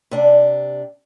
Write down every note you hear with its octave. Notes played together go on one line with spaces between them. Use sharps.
C3 D4